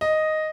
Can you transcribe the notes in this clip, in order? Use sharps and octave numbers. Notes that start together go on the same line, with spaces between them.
D#5